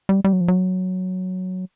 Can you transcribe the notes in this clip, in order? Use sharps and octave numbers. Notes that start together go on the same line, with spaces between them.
G3
G3
F#3
F3
F#3